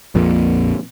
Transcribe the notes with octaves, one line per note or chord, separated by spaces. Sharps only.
A#1 F2 A#2